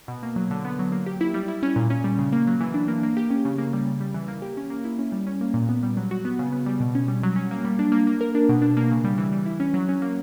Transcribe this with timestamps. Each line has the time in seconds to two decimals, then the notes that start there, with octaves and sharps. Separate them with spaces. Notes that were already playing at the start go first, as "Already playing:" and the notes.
0.08 B2
0.23 A#3
0.36 F#3
0.51 D3
0.65 B3
0.79 F#3
0.92 A#3
1.06 G4
1.21 E4
1.34 G3
1.48 E4
1.63 C#4
1.76 A#2
1.90 C#4
2.04 G3
2.19 C#3
2.33 A#3
2.47 F#3
2.60 E3
2.74 D4
2.88 A#3
3.03 A#3
3.17 G4
3.30 C#4
3.45 C#3
3.58 A#3
3.73 G3
3.86 C#3
4.00 G3
4.14 E3
4.28 A#3
4.42 G4
4.57 C#4
4.70 A#3
4.85 E4
4.99 C#4
5.12 G3
5.27 C#4
5.41 A#3
5.54 A#2
5.69 B3
5.83 G3
5.97 F#3
6.11 F#4
6.25 B3
6.39 C#3
6.52 B3
6.66 G3
6.80 B2
6.95 C#4
7.08 G3
7.23 F#3
7.36 C#4
7.51 A#3
7.65 G3
7.79 D4
7.92 A#3
8.07 A#3
8.21 A#4
8.35 D4
8.49 B2
8.62 D4
8.77 A#3
8.91 C#3
9.04 G3
9.18 E3
9.33 G3
9.46 E4
9.60 C#4
9.74 F#3
9.89 C#4
10.02 A#3